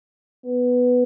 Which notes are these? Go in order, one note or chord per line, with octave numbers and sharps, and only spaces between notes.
B3